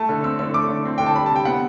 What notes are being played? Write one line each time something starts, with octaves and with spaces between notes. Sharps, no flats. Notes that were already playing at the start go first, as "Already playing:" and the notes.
Already playing: A3 A5
D3
C4 E6
D3 E6
A3 D6
D3
C4
D3 G5
A5
G3 B5
A5
C3 G5
B3 F#5